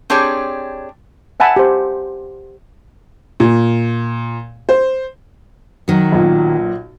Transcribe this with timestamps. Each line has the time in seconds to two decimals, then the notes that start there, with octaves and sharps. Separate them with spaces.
0.10 C4 D4 G4 G#4 C#5
1.40 E5 F#5 G#5 A5 B5
1.56 G4 C5
3.40 A#2
4.69 C5
5.88 D#3 F#3
6.12 B1 A#2